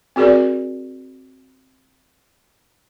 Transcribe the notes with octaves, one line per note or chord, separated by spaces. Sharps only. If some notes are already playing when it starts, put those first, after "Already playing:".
C4 F#4 G#4 A#4 D5